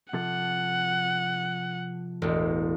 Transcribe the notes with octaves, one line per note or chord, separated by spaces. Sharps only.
C3 F3 A4 F#5
E1 A1